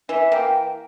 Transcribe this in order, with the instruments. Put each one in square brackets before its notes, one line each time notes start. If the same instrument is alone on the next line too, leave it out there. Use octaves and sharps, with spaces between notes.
[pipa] E3 [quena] E5
[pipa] A#3 [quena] G5